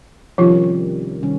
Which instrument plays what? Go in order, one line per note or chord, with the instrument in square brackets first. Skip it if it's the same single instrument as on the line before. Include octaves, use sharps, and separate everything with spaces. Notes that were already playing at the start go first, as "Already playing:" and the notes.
[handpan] C3 D#3 G3 C#4 [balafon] F3 F4
[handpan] C3 D#3 G3 C#4